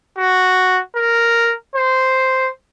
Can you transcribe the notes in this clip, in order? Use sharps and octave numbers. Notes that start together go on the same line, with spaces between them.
F#4
A#4
C5